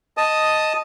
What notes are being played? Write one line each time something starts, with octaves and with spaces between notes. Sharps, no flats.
D#5 A5 D#6